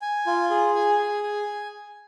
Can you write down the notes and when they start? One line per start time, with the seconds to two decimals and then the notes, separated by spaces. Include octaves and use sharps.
0.02 G#5
0.27 F4
0.50 G#4
0.75 G#5
0.99 G#4
1.23 G#5